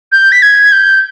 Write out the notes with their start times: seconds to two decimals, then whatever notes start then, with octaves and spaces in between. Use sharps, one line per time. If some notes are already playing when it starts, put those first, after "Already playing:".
0.12 G6
0.32 B6
0.42 G#6
0.72 G6